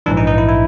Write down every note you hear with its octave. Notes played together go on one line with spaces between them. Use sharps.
A#1 G#2 E3 D4
D#4
D#4
E4
E4